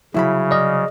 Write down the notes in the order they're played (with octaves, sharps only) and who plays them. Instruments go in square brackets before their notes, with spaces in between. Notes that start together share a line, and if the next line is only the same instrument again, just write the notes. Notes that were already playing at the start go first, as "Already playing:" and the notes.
[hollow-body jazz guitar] C2 F#3 B5 [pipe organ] C#3 [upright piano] E4
[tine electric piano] D5 D#5 [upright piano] F6